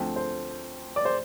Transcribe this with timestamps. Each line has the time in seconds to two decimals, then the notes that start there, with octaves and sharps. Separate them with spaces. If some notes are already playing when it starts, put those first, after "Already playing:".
Already playing: D2 D3 F3 C4 G5
0.16 C5
0.96 D5
1.05 C5